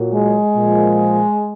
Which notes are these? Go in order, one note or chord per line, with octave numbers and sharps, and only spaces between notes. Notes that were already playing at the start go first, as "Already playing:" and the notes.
Already playing: A#2 F#3
G#3
A#2 F3